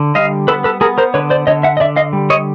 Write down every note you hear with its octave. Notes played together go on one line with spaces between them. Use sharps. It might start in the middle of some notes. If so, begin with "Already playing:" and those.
Already playing: D3
G3 D#5 F5
B3 A4 B4
A4 B4
B3 G#4 A#4
A#4 C5
D3 B4 C#5
C5 D5
D3 C#5 D#5
E5 F#5
D#5
D3 D5 E5
D#5 F5
G3
C#5 D#5